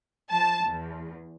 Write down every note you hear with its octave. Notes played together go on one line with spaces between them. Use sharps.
F3 A5
E2